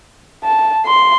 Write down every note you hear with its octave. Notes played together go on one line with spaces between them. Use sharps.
A5
C6